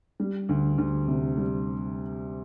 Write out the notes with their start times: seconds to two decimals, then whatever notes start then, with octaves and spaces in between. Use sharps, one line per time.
0.20 G3
0.49 D2
0.78 D2
1.08 C3
1.37 G3